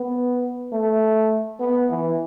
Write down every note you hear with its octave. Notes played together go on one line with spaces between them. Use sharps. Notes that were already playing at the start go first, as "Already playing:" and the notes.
Already playing: B3
A3
B3
E3